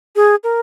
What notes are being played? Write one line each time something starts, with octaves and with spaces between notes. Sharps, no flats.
G#4
A#4